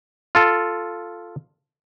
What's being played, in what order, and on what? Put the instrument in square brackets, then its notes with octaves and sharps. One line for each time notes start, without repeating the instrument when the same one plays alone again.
[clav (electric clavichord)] F4 A4